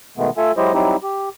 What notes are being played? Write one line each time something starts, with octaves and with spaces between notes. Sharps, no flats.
B2 D#3 G#3 A3 B3
A3 F4 A4 E5 G#5
F#3 G#3 E4 G4 C5 D#5
F#3 G3 C4 D#4 E4 G4
G4